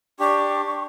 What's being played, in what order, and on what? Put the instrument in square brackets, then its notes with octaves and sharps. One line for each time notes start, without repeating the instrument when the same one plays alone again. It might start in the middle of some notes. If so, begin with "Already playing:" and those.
[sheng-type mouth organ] D4 G4 [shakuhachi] C#6